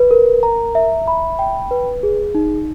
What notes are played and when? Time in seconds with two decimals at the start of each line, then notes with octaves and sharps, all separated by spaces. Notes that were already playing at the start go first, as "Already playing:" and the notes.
Already playing: B4
0.11 A#4
0.43 A#5
0.75 E5
1.08 B5
1.39 G5
1.71 B4
2.03 G#4
2.35 D#4